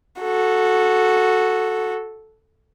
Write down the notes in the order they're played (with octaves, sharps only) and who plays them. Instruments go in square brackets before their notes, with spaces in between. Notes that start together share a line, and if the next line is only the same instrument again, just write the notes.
[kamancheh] F#4 A4